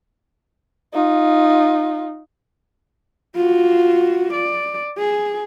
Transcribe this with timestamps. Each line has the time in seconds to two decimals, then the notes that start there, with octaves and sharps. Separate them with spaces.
0.93 D#4 F4
3.35 F4 F#4
4.33 D5
4.99 G#4